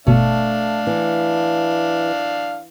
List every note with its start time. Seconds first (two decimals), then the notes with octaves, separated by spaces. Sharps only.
0.07 G1 B2 A3 D4 F5
0.87 E3